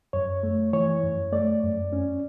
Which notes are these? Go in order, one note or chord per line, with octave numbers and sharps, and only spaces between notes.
F#2 C#5
A3
E3 C#5
F#2
A3 D5
F#2
C#4